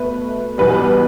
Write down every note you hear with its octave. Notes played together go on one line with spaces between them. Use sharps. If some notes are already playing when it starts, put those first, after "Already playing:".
Already playing: B2 A3 B4
E2 B2 G3 B4